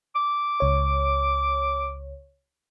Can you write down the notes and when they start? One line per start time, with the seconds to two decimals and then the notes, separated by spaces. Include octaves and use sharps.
0.15 D6
0.60 C#2 C#5